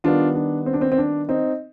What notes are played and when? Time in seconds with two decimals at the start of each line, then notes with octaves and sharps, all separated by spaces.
0.04 D#3 G3 B3 D4 F4
0.35 D4
0.66 C4
0.73 D4
0.81 C4
0.92 C4
0.98 D4
1.29 C4 D#4